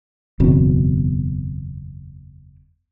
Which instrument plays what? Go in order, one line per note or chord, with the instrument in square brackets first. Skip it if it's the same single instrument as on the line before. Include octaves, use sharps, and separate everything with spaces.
[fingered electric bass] F#1 E2 B2 C4